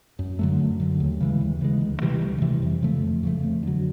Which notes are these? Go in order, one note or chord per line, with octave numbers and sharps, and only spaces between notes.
F#2
D3 F#3 A3
F#2
D3 F#3 A3
D#2
C#3 E3 G#3
D#2
C#3 E3 G#3
D2
C3 E3 G3
D2
C3 E3 G3
F2
C#3 F3 A3
F2
C#3 F3 A3
F2
D3 F#3